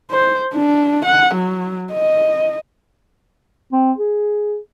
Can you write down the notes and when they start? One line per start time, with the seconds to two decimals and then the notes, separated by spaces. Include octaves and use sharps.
0.11 C5
0.54 D4
1.06 F#5
1.35 F#3
1.93 D#5
3.72 C4
3.98 G#4